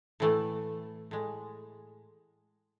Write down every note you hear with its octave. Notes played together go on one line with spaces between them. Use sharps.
A2 E3 A3
A2 G#3